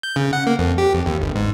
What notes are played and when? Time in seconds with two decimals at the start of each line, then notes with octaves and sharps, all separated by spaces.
0.03 G6
0.16 C#3
0.33 F#5
0.47 A#3
0.59 F2
0.78 G4
0.94 F2
1.06 D#2
1.21 G1
1.36 G#2